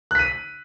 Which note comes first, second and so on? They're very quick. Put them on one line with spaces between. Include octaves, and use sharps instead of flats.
F#6 B6 D#7